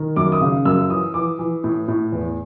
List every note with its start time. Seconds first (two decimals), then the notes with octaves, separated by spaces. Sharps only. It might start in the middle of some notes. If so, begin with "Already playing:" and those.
Already playing: D#3
0.16 F#2 D6
0.32 D#6
0.41 C#3
0.65 F#2 E6
0.90 E3 D#6
1.14 E3 D6
1.39 E3
1.64 A2
1.88 A2
2.12 E2